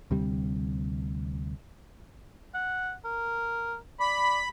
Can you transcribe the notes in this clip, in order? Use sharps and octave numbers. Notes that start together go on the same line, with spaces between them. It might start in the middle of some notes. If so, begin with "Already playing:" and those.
D2 C3 G3
F#5
A#4
D5 B5